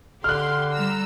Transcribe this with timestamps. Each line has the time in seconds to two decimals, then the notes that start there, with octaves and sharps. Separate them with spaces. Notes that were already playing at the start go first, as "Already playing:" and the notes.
0.24 D3 G4 C6 F6 F#6
0.72 G3 A#5 E6